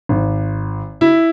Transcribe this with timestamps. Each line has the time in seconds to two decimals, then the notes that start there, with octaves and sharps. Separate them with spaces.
0.09 G#1
1.01 E4